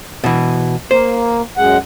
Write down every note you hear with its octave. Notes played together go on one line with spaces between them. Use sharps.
B2 E3
A#3 C5
F#2 G#3 F#5